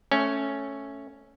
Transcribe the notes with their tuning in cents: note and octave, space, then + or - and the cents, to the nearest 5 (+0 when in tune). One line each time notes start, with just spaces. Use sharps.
A3 +0 C#4 +0